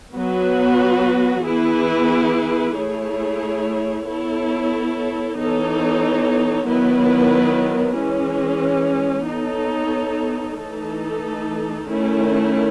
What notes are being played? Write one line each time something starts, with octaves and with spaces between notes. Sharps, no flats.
F#3 B3 F#4 B4
E3 B3 E4 G#4 B4
A3 E4 G#4 C#5
B3 E4 A4 C#5
E3 B3 D#4 A4 C#5
D#3 F#3 B3 E4 B4
E3 G#3 C#4
B3 D#4 A4 C#5
E3 A3 D#4 A4
D#3 A3 C#4 E4